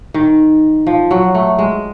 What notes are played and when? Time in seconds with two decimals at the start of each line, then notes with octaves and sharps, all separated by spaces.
0.14 D#3
0.87 F3
1.11 F#3
1.35 A3
1.58 G#3